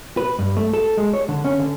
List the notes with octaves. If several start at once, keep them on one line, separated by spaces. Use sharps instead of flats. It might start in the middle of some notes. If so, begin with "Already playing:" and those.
B4
G2
A3
A4
G#3
C#5
D3
C#4
D3